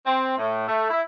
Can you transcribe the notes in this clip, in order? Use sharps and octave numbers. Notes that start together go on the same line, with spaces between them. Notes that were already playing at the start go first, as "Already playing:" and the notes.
C4
A2
A3
E4